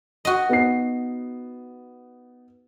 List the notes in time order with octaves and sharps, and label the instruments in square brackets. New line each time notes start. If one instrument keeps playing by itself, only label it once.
[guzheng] F#4 D#5
[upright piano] B3 D#4 C7